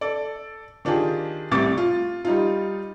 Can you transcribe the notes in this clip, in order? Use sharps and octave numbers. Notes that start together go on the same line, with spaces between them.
A4 D5
D#3 D4 F4 G4 G#4
C2 A2 C3 C#6 D6 A6
F4
G3 D#4 F4